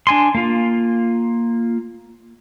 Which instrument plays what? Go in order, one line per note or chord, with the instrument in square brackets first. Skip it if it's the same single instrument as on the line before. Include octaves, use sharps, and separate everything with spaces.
[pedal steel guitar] D4 G#5 C6
A#3 F4